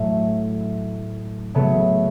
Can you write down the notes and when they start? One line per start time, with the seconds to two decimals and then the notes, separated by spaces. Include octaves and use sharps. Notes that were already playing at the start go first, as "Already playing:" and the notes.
Already playing: A2 F#3 A3
1.55 C#3 F#3 A3 B3